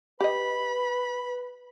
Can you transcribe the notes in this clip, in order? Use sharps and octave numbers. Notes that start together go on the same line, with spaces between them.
G4 B4 D#5 B5